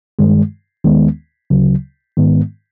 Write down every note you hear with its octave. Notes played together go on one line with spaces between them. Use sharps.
G2 D#3 G#3
D#2 D#3 G#3 B3
D2 C#3 F#3
G#2 D#3 G#3 B3